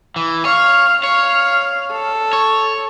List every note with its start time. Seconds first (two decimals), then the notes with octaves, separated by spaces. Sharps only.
0.16 E3
0.45 C#5 F5
1.04 C#5 F5
1.92 A4
2.33 C#5